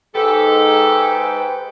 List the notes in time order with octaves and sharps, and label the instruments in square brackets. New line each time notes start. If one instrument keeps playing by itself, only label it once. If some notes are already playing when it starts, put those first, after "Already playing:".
[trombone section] G#2 [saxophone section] G4 A4 [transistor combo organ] B4 G5